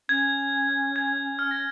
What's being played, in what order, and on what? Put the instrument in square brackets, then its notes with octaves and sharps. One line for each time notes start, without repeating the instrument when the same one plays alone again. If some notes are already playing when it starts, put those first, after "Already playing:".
[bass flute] C#4 [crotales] G#6
[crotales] G#6
F6
A#6